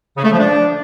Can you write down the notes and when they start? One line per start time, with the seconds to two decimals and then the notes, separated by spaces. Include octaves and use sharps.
0.17 C#3
0.24 A3
0.31 F3
0.39 D4